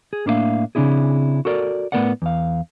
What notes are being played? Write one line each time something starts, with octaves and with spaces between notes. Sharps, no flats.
G#4
A2 A#3 D4 E4 E5 F5
C#3 C4 D4 E4 G#4
F#4 A4 A#4 D5
A2 A3 B3 A#4 D5 F#5
E2 F5